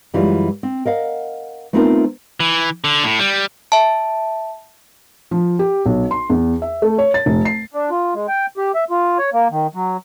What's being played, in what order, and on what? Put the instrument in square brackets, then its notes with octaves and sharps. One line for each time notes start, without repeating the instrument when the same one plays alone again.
[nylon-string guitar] F#2 E3 G3 G#3 F4
C4
A#4 D#5 F5 F#5
A3 B3 C4 D#4 F4 A#4
[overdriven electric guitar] E3
D3
A2
G3
[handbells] E5 A5
[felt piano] F3
G4
B1
C6
E2
E5
A3
C#5
A6
F1
C7
[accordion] D4
F4
G#3
G5
G4
E5
F4
C#5
A#3
D#3
F#3